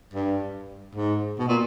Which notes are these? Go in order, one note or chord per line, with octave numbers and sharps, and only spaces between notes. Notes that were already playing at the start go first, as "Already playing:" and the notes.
G2
G#2
B2
A#2